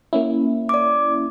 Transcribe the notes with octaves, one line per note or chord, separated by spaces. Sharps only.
A#3 C#4 E4
D5 D6